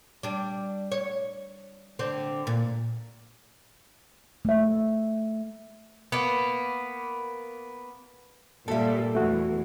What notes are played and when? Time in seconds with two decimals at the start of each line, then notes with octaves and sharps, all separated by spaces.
0.23 G3 D4
0.92 C#5
1.99 D3 C4
2.47 A#2
4.45 A3 E5
6.12 A#3 B3
8.68 A#2 G3 A4 E5
9.15 E2 E3 A3 F#4